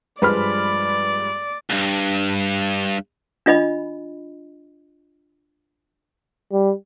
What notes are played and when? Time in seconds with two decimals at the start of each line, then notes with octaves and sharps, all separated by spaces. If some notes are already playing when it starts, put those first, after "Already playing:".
0.22 G2 F3 G#3 B4 D5 B5 F6
1.70 C#2 G2
3.46 D4 F4 D#5 B5
6.52 G3